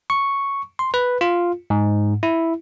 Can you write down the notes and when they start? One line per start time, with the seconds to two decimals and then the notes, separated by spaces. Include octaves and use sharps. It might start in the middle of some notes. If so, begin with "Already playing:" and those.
0.10 C#6
0.79 C6
0.94 B4
1.21 F4
1.70 G#2
2.23 E4